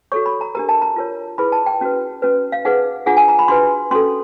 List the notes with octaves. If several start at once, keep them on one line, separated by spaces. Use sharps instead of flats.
F#4 A4 C#5 C#6
B5
A#5
D4 G4 A#4 A#5
A5
A#5
F4 A#4 C#5
E4 G#4 B4 B5
A5
G5
C#4 F#4 B4
C#4 F#4 B4
F5
D#4 G#4 B4 F#5
D4 F4 G#4 F#5
G#5
A#5
B5
D4 F#4 B4 C6
C#4 F#4 A4 C6